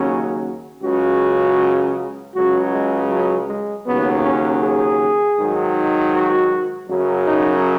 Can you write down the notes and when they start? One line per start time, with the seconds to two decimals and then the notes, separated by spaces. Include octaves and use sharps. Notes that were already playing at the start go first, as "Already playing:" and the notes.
Already playing: D#2 C#3 F#3 C#4
0.83 C#2 C#3 F#3 F#4
2.35 C#2 C#3 F#3 F#4
2.73 G#3
3.10 F#3
3.49 G#3
3.86 D#2 C#3 F#3 B3
4.24 C#4
4.63 G#4
5.38 G#2 D#3 F#3
6.14 F#4
6.90 F#2 C#3 F#3
7.27 D#4